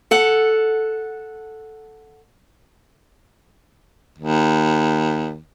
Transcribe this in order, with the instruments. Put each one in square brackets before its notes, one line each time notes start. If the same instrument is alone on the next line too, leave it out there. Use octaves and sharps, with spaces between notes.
[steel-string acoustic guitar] A4 F#5
[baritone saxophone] D#2